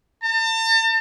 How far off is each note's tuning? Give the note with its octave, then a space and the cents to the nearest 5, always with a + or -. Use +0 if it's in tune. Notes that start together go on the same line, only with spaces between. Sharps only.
A5 +40